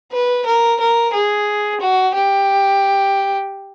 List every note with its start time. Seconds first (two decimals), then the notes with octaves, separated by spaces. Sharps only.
0.12 B4
0.46 A#4
0.80 A#4
1.13 G#4
1.81 F#4
2.14 G4